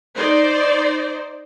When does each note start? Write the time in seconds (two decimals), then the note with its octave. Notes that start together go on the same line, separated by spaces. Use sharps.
0.16 D#4 C5 D5